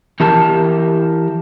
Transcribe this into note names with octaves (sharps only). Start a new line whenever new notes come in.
E3 G4 A#4 A5